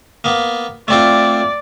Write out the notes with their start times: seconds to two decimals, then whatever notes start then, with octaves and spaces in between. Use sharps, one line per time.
0.24 A#3 B3
0.88 A3 C4 F4 D5